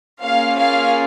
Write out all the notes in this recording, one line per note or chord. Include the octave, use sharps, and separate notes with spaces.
A#3 C#4 F4 G#4 F5
F5